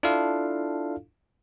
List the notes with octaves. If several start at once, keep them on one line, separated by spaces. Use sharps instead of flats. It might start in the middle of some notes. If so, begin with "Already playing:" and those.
D4 E4 F4 A4 F5